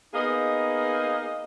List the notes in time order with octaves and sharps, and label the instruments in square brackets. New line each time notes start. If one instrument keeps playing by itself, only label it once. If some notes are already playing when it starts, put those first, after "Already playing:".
[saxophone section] A#3 B3 D#4 G#4 D#5